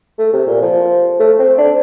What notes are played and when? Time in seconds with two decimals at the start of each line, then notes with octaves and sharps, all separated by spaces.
0.19 A3
0.33 C3
0.47 A#2
0.62 F3
1.19 A3
1.39 C4
1.58 D4